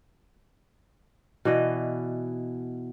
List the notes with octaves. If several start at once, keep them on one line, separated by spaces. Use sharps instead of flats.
B2 E3 D5 D#5